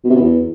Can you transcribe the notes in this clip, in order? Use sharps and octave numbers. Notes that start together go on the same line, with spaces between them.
B2
C3
B2
E2